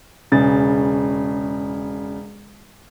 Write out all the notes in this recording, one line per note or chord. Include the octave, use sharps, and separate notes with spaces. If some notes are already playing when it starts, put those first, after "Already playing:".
E1 C#3 A6